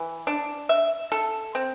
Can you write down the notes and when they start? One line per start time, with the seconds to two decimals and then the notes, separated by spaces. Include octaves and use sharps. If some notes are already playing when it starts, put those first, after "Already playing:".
Already playing: E3
0.27 D4
0.69 E5
1.12 A4
1.55 C4